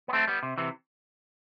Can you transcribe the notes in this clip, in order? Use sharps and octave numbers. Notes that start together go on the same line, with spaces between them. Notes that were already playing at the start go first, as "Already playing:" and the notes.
B3
A3 C4
G3 B3
C3
C3 E3